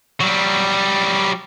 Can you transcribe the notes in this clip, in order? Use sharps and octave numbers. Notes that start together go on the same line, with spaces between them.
F#3 G3